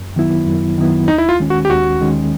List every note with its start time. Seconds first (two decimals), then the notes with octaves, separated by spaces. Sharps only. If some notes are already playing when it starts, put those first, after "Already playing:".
Already playing: F#2
0.16 D#3 F#3 B3 E4
0.47 F#2
0.78 D#3 F#3 B3 E4
1.08 D#2 D#4
1.18 E4
1.29 F4
1.40 D#3 G#3 C#4
1.50 F#4
1.65 G4
1.70 D#2 F#4
2.01 D#3 G#3 C#4